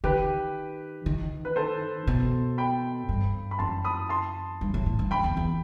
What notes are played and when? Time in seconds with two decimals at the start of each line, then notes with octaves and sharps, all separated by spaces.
0.04 D#3 G4 B4
1.06 D#3
1.45 B4
1.56 A4 C5
2.07 B2
2.58 G5 B5
3.09 G2
3.51 B5
3.59 F#2 A5 C6
3.84 B5 D#6
4.09 A5 C6
4.61 G2
4.74 A2
4.86 A2
4.99 G2
5.11 F#2 G5 B5
5.24 E2
5.37 E2